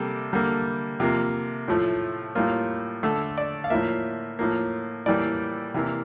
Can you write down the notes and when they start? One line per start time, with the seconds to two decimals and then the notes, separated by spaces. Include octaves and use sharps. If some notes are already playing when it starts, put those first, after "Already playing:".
Already playing: C3 G3 A#3 A4
0.33 D3 G3 A#3
1.00 C3 F3 A#3
1.68 A2 F3 A3
2.35 A2 G3 A#3 F4
3.03 D3 A3 A4
3.38 D5
3.64 F5
3.70 A2 F3 A#3 E5
4.39 A2 F3 A#3
5.06 A2 E3 G3 A#3 D5
5.74 C3 E3 A#3